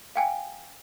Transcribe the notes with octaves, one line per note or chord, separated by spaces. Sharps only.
F5 G5 G#5